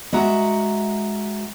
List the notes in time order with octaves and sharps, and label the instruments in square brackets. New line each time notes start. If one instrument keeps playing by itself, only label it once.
[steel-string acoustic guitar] G#3 F#4 E5 F#5 A#5